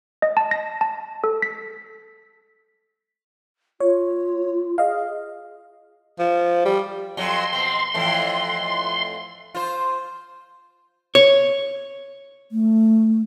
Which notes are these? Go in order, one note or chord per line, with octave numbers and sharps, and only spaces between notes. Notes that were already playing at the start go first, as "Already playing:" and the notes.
D#5
A5
A#6
A5
A4
B6
F4 C#5
G#4 D#5 F5
F3
G3
F2 F#3 C6
B2 C4
F2 A2 E3
F4 C5
C#5
A3